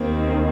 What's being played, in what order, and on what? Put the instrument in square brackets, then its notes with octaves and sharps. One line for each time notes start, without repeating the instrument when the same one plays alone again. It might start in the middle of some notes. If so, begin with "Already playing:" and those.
Already playing: [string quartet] D#2 D#3 C4 [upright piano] A#3